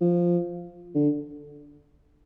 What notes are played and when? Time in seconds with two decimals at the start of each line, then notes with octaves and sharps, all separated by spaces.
0.01 F3
0.95 D3